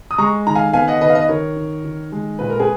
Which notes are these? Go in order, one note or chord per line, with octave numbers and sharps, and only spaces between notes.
D#6
G#3 A#5 C#6
D#3 A#5
F5 G#5
B3 F5 G#5
D#5 F#5
D#3 B4 D#5
F5
B4 D#5
D#3 A#4 C#5
D#3
D#3
G#3
A#2 B4
A#4
G#4 B4